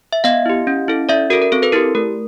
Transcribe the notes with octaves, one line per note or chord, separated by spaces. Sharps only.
E5
B3 D#5 F5
E4 G4
C#4
E4 A4
C#4 D5 E5
F#4 A4 A#4
A#4
C4 A4
A4 B4
E4 G4 A#4
A3 A#4